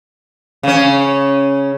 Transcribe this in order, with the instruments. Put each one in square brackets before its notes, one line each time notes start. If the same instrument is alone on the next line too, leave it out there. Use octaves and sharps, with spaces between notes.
[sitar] C#3 C#4